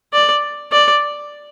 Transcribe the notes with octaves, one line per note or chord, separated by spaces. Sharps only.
D5
D5